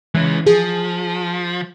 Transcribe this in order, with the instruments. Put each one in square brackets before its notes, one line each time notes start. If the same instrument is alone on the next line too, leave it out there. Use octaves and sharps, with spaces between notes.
[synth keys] E3 [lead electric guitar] G#3 C#4
[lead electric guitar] F3 [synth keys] G#4